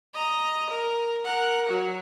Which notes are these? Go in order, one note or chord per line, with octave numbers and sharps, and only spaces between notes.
D#5 A#5
A#4
A#4 F#5
F#3 F#4